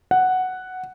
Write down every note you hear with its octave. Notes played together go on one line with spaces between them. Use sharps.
F#5